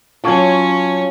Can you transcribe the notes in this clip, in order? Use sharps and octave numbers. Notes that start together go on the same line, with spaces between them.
F#3 C#4 F4 C#5 A5 C#6 G#6